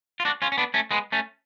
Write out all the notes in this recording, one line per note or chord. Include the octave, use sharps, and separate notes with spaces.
F4
D4 F#4
C#4 F4
C#4
B3 D4
A3 C#4
G#3 B3
A3 C#4